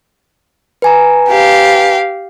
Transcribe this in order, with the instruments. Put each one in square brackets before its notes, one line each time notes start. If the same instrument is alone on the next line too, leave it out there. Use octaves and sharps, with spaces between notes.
[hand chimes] B4 G#5 A#5
[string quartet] G4 F5